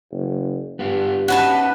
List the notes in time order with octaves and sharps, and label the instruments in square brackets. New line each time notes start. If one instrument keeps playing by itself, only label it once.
[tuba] F#1
[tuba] G2 [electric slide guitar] B3 F4
[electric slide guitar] C#4 D#4 [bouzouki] F#4 B4 A5